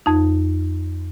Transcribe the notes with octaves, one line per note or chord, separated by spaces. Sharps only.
F2 D#4